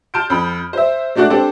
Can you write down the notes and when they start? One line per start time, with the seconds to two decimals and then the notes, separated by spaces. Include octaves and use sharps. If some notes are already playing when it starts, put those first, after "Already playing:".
0.14 A5 C6 F6 G6 D7
0.30 F2 B5
0.73 C5 E5
1.15 G#3 A3 D4 F#4 D5
1.30 C4 D4 G4 A4 C5